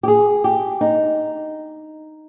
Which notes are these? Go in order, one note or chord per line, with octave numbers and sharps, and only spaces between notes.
G4
G#4
G4
D#4